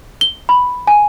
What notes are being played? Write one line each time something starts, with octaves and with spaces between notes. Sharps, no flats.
G7
B5
G#5